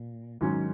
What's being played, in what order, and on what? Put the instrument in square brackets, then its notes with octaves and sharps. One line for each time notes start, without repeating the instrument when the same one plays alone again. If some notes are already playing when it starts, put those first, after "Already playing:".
Already playing: [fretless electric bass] A#2
[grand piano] G#2 F#3 C#4 [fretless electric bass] D#3